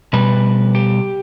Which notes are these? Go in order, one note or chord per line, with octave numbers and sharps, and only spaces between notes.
B2 G3 B4
G4